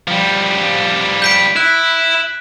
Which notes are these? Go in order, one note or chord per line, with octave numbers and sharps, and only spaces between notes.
F3 G3
G6 B6 D7
E4 F#6